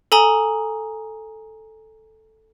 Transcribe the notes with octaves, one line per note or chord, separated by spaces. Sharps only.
A4 G#5 A#5 D#6 G7